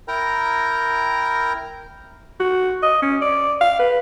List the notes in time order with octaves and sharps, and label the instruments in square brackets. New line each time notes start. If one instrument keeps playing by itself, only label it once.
[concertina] E4 A#4 G5 A#5
[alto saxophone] F#4
D#5
C#4
D5
F5
B4